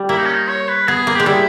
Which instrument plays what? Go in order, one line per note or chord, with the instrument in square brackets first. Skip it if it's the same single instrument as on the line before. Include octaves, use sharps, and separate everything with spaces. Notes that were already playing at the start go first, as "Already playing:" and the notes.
Already playing: [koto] G3
[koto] A#3 [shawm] E4
[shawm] D#4
C#4
D#4
C#5
B4
[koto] B3 [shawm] G#4
[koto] A#3
[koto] G#3 [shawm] G4
[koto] G3 [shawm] E4